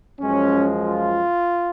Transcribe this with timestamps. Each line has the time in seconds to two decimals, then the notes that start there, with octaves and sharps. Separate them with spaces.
0.20 F#2 F3 G#3 C#4
0.86 F4